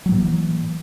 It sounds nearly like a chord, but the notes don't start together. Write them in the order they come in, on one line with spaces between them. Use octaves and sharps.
F#3 A2 E3 A#3